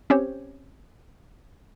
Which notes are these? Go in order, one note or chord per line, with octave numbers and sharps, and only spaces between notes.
C4 C#4 G4 C5 C#5